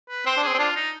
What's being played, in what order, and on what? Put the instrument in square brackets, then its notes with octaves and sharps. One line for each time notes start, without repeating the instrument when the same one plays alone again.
[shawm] B4
[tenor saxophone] C4 [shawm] C5
[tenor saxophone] D4
[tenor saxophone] C4 [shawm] G#4
[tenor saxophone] C4
[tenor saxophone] D4 [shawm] F4
[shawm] D#4